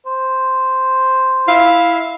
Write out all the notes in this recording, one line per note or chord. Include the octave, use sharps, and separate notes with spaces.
C5
E4 E5 F5